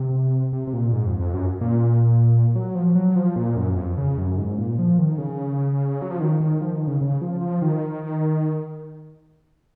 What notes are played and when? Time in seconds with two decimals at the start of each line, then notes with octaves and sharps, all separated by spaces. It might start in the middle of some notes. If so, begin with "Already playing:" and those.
Already playing: C3
0.53 C3
0.67 C3
0.73 A#2
0.93 G#2
1.06 F2
1.20 F2
1.34 F#2
1.61 A#2
2.55 F#3
2.75 F3
2.95 F#3
3.16 F3
3.36 A#2
3.56 F#2
3.76 F2
3.98 C#3
4.18 F#2
4.38 G#2
4.58 A#2
4.79 F3
4.99 D#3
5.18 C#3
6.02 F#3
6.11 F3
6.20 D#3
6.40 D#3
6.61 F3
6.74 D#3
6.87 C#3
7.01 C#3
7.21 F3
7.41 F3
7.62 D#3